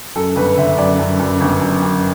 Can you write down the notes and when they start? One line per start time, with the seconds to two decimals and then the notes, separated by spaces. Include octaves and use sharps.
0.16 F#2 A4
0.36 G1 B4
0.57 D3 E5
0.78 F#2 D5
0.99 F#2
1.20 F#2
1.41 G1
1.62 F#2
1.83 F#2